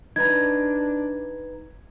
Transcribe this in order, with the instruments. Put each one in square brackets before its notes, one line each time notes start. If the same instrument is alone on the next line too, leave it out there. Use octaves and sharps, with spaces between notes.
[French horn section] D4 [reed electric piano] D#4 B4 A#5 [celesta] G#6